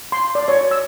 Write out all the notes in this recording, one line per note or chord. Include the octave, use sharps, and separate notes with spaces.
C6
D5
C#5
E6